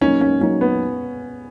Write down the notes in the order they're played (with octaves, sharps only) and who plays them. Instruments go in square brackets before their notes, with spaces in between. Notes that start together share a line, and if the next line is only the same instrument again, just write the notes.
[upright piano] F#3 A#3 D#4 [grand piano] C#4
[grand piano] C#4
[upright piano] F#3 A#3 D#4 [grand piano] C#4
[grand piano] B3